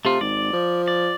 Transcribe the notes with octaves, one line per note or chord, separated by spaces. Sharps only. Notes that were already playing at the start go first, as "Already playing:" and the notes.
C3 A3 F4
G#1 D5
F3
D5